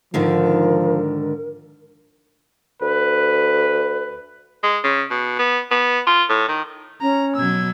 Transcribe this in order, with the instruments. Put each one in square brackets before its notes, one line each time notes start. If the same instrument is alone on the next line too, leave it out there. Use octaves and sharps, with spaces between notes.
[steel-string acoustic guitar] G#2 D3 D#3 [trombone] F3 [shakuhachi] A#4
[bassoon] D2 [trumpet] B4
[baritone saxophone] G#3
C#3
B2
B3
B3
F4
A2
D#3
[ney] C#4 [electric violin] A#5
[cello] B2 F#3 [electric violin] E6 G#6